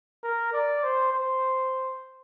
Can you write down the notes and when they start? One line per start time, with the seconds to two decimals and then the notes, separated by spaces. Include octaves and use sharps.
0.24 A#4
0.53 D5
0.83 C5
1.13 C5